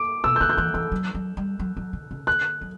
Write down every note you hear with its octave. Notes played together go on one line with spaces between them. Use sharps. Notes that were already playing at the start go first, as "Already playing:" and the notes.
Already playing: D6
B2 E6
G6
D3 F#6
G6
E3 F#6
E3 E6
F#3
F#3
G3
F#3
F#3
D3
C#3
D3 F#6
F#3